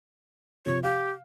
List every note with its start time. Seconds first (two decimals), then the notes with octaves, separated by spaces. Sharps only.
0.66 C3 F3 C#5
0.83 G4 F5